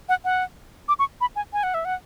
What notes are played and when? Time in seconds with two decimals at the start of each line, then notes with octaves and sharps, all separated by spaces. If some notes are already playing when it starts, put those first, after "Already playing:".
0.09 F#5
0.25 F#5
0.88 D6
0.99 C#6
1.21 B5
1.36 G#5
1.53 G#5
1.63 F#5
1.74 E5
1.85 F#5